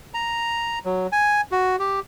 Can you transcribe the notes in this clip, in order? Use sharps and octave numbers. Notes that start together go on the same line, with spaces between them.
A#5
F#3
G#5
F#4
G4